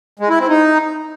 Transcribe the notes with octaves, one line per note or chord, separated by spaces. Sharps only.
G#3
E4
C4
D#4